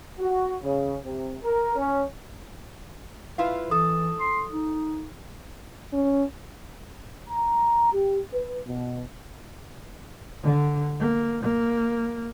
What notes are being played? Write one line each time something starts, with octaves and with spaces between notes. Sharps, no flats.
F#4
C#3
C3
A#4
C#4
E4 F4 B4 F5
E3 A4 D#6
C6
D#4
C#4
A#5
G4
B4
B2
D3
A#3
A#3